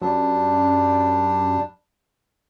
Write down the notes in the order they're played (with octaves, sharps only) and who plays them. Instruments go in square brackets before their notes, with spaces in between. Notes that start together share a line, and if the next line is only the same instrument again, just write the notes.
[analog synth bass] F#2 [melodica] G3 D4